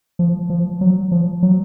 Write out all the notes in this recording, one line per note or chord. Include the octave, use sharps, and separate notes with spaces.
F3
F3
F#3
F3
F#3